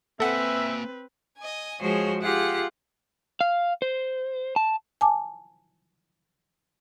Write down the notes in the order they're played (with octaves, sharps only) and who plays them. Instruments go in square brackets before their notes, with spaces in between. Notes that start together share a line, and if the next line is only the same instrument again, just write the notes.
[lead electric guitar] A#3 G#5 [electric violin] C4 B4 [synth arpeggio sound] A4 F#5 [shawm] E5
[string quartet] D#5 G#5
F3 G#3 F#4 G#4 C5 C#5
F4 G4 G#4 F#5
[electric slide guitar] F5
C5
A5
[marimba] G#5 A5 D6